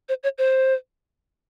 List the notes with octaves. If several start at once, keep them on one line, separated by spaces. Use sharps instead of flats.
C5
C#5
C5